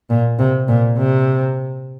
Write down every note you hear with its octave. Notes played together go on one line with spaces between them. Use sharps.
A#2
C3
A#2
C3